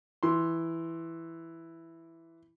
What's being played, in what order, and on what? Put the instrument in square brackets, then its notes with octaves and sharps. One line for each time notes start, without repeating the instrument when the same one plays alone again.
[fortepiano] E3 C6